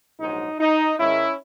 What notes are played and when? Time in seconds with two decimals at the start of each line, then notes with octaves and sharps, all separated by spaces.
0.19 A#1 G#2 F#3 D#4
0.59 D#4
0.98 G#2 D#3 G#3 C#4 E4